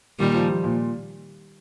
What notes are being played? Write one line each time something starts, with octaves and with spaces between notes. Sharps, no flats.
A#2 D#3 G3
F3
F3
A#2